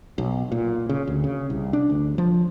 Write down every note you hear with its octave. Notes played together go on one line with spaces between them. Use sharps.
B1
A#2
C#3
D2
C#3
C2
D4
D2
F3